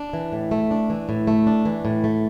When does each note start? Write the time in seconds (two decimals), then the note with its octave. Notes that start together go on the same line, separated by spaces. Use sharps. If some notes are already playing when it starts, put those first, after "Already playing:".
Already playing: D4
0.13 E3
0.33 A2
0.51 A3
0.71 D4
0.90 E3
1.09 A2
1.28 A3
1.47 D4
1.65 E3
1.85 A2
2.04 A3